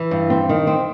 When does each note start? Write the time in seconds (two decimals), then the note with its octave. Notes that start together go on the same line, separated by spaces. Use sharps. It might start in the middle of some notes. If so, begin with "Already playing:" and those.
Already playing: E3
0.11 G2
0.30 C4
0.49 D#3
0.67 C4